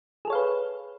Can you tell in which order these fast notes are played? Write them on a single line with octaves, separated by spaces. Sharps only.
G#4 A4 C#5 F5 B4